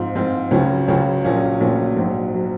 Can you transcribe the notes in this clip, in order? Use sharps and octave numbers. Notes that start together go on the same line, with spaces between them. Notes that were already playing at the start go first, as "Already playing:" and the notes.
Already playing: G#2 F3 C4 F4
G#2 F3 C4 F4
C#2 C#3 F#3 C#4 F4
C#2 C#3 F#3 C#4 F4
A#1 A#2 F#3 C#4 F4
A#1 A#2 F#3 C#4 F4
A#1 G#2 F#3
F#3